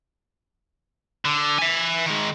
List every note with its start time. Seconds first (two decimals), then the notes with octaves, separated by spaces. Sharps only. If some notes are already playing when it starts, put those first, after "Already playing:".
1.25 D3
1.59 E5 G#5
2.06 D#3 G#3